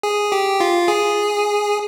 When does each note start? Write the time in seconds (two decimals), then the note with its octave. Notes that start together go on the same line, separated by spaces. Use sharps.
0.03 G#4
0.32 G4
0.60 F4
0.88 G#4